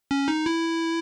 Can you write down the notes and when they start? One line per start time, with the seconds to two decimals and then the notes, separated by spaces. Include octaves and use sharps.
0.11 C#4
0.28 D#4
0.46 E4